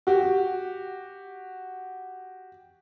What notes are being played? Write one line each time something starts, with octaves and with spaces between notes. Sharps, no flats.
F#4 G4